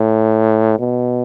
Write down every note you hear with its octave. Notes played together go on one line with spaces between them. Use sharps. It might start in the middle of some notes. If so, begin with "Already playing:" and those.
Already playing: A2
B2